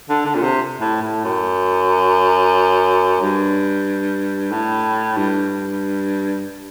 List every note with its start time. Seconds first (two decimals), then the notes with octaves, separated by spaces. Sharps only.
0.09 D3
0.26 D3
0.35 A#2
0.43 C3
0.80 A2
1.02 A2
1.24 F#2
3.21 G2
4.51 A2
5.17 G2